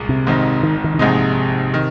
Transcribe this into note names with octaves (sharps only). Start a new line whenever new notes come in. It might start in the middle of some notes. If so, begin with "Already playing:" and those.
Already playing: C2 A#2 G#3
C3
G#1 G#2 D#3 C4 D#4
D#3
D#3
D#3
A#1 G#2 C3 G#3 D#4
D#3